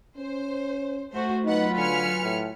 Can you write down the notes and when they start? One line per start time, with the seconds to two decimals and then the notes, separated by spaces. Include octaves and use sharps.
0.17 C#4 C5
1.13 A3 F#4 C5
1.44 F#3 B3 D#4 F4 B4 F#5
1.76 D3 G#5 F6 C#7
2.23 A2